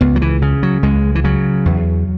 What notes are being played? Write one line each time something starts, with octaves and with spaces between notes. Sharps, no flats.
C#2 B3
F#3
E3
C#3
F#3
C#2 G#3
E3
C#3 F#3
E2